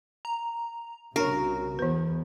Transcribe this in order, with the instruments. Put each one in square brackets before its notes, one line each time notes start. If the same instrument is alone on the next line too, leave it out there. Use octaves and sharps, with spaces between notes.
[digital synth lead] A#5
[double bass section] C2 C#3 [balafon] D4 C#5 [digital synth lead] F#4 [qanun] A#4
[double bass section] E2 B3 [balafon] E3 B4